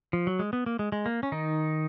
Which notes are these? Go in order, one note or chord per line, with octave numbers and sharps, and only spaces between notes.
F3
F#3
G#3
B3
A#3
G#3
G#3
A#3
C#4
D#3 D#4